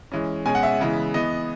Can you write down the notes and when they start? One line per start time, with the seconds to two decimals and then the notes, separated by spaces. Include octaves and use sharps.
0.12 E3 G#3 C#4
0.45 B2 G#3 C#4 G#5
0.55 F#5
0.63 E5
0.80 C#3 E3 G#3 B3
1.14 E3 B3 D#5